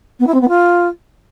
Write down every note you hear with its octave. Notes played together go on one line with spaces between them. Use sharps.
B3
E4
C4
B3
F4